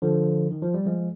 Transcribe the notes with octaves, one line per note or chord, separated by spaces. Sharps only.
D3 F3
D#3
F3
G3
F3 G#3